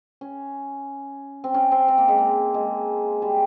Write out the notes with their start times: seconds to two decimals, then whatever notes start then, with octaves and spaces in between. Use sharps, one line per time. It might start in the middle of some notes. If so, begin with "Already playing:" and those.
0.21 C#4
1.44 C4
1.54 C#4
1.72 C4
1.88 C4
1.98 A#3
2.08 G#3
2.18 A#3
2.54 G#3
3.22 G3